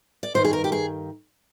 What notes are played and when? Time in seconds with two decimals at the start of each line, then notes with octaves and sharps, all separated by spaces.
0.23 D5
0.34 G2 D#3 C5
0.44 G#4
0.53 A#4
0.64 G4
0.72 G#4